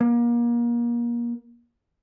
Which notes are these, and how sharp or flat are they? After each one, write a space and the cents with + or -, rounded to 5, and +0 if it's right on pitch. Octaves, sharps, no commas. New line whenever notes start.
A#3 +30